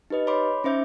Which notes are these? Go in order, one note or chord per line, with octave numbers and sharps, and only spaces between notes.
D#4 G4 B4 D#5
C#5 B5 C6 D6
C#4 D#4 C5 E5 D6 G6